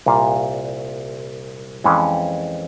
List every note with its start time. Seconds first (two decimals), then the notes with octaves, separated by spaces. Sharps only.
0.06 C2 A#2 G3 A#3 F4
1.84 F2 E3 G#3 C#4